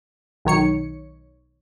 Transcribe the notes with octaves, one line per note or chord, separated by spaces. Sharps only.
B1 D#3 C#5 C#7